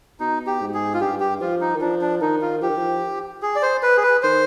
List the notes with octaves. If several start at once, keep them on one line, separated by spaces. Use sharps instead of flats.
B2 D#4
G4
G#2
G#4
F4
G2 G4
G4
F3 F4
D#4
D#3
F3 D4
D4
D#3 D#4
F4
F3 G4
D#3
F3
G#4
D5
C5
B4
G#4
B4
D#3 C5